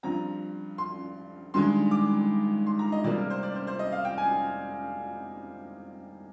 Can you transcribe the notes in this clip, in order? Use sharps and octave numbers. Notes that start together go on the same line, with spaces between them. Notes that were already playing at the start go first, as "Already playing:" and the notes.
G2 F3 C4 A#5
C6
G2 D#3 G#3 C6
D6
C6
A#5
D#5
C3 G3 A#3 D5
A#4
C5
D5
C5
C5
D#5
F5
G5
G#5